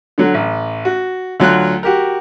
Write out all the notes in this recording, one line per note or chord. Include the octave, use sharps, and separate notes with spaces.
D3 F#3
A1
F#4
D2 F#3 F4 F#6
F#4 G4 A#4